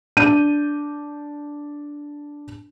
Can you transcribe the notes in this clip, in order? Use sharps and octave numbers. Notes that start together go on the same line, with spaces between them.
D4 G6 D#7